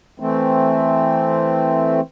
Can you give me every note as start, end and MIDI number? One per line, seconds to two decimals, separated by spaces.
0.20 2.00 52
0.20 2.00 57
0.20 2.00 60